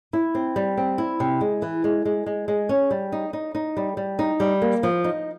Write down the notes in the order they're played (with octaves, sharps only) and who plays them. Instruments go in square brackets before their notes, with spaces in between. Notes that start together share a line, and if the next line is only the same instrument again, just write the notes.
[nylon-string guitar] E4
C4
G3
C4
E4
C3
G#3
E3
G#3
G#3
G#3
G#3
C#4
G3
D#4
D#4
D#4
G3
G3
D#4
G3
A#3
F3
D#4